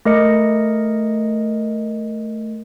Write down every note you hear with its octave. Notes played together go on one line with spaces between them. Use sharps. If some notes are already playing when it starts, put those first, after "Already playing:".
A3 A#4 D#5 A#6 C#7